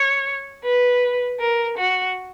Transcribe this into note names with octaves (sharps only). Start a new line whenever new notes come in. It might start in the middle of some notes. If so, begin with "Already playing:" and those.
Already playing: C#5
B4
A#4
F#4